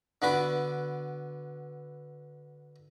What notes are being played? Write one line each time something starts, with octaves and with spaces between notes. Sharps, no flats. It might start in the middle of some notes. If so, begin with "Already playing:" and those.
D3 B3 F#4 B5 D6